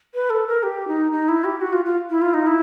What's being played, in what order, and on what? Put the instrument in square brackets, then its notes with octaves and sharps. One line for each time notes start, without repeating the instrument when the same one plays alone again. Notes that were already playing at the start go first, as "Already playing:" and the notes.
[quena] B4
A4
A#4
G4
D#4
D#4
E4
G4
F#4
F4
F4
E4
F4
D#4
E4